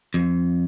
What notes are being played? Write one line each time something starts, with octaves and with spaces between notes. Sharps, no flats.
F2